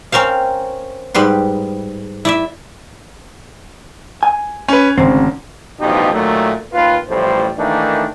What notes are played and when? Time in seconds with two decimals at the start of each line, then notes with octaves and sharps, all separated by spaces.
0.12 C4 C#4 A#4 C5 F5
1.14 G#2 G3 B4 C6
2.25 E4 D5 E5
4.23 G#5
4.68 C#4 B4
4.98 G#1 D2 C#3 C4
5.80 A1 G2 B2 F3 D#4 G4
6.14 A#2 D#3 F#3 A3
6.73 D#2 F4 B4
7.09 A1 A2 F3 G3 C5
7.58 D#3 E3 A3 A#3 D4 D#4